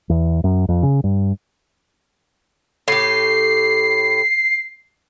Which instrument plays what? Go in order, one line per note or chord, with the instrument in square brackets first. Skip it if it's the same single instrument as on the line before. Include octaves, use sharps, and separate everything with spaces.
[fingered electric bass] E2
F#2
F2
C#3
G2
[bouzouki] A2 G4 [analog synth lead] C7